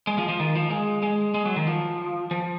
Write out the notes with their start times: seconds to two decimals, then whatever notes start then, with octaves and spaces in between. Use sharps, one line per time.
0.07 G#3
0.18 F3
0.29 F3
0.40 D#3
0.55 F3
0.70 G#3
1.03 G#3
1.34 G#3
1.45 F#3
1.56 D#3
1.67 F3
2.31 F3